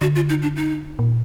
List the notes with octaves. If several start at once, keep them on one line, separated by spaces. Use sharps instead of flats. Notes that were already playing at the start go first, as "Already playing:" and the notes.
D3 F#4
F4
D#4
D4
D#4
A#2